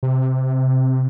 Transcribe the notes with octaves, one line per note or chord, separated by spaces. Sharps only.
C3